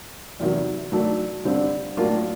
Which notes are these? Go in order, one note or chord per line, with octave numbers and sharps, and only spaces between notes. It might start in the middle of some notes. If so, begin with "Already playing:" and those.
E2 C3 D#3 F#3
D#3 F#3 A3 D4
G2 D3 G3 C4
A2 F#3 A#3 D4 F4